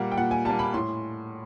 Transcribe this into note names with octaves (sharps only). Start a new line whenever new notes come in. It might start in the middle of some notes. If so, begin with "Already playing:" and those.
Already playing: A#2 G3 A#3 F#5
G5
A#2 F#5
G#5
G3 A#3 A5
B5
A2 C6